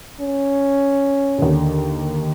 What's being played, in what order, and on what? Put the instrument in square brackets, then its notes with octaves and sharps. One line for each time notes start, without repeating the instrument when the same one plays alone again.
[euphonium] C#4
[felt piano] D#2 D3